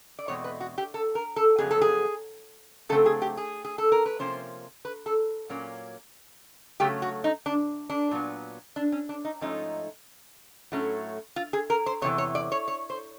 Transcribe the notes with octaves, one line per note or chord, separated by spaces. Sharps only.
D5
E2 B2 G#3 C4 C#5
B4
F#4
G4
A4
A#4
A4
F2 C#3 F#3 B3 G#4
A4
G#4
C#3 F#3 A3 C4 A4
G#4
G4
G#4
G#4
A4
A#4
B4
C3 F3 A#3 C#4 C5
B4
A4
A#2 F#3 A#3 C#4
C#3 F#3 A3 C#4 G4
F#4
D#4
D4
D4
A#2 F#3 B3
D4
C#4
D4
D#4
G#2 F3 A3 C#4 D#4
A2 F#3 A3 C#4
F4
G#4
A#4
C5
E2 C3 E3 C#5
C#5
D5
C#5
C#5
C5